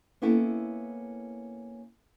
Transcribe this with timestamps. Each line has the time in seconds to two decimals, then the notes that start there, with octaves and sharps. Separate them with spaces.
0.22 A#3 B3 C#4 E4 A4